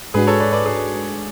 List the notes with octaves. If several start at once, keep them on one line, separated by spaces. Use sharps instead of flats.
G#2 G#3 D4 F#4 G#4 B4
A4 C#5
B4 D5
B4 D5
G#4 B4